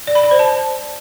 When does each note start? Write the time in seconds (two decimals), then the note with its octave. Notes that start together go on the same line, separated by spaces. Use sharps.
0.07 D5
0.15 B5
0.23 D5
0.31 C5
0.39 A5